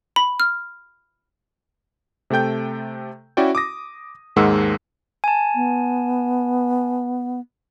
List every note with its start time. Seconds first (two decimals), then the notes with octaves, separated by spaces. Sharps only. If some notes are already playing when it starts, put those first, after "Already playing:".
0.16 B5
0.40 F6
2.30 C3 A3 A4 G5 G6
3.37 C#4 E4 F#4 D5 G5
3.55 D6 D#6 A#6
4.36 D#2 G#2 G#3 A#4 F#5 E6
5.24 G#5 A5
5.55 B3